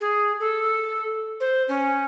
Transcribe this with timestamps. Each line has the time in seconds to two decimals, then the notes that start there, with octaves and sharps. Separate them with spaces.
0.01 G#4
0.40 A4
1.40 C5
1.68 C#4